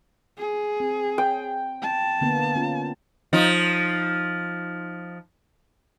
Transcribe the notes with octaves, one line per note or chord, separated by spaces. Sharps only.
G#4
C4
G5
A5
D3 A#3 B3
B3 C#4 F4
F3 D#4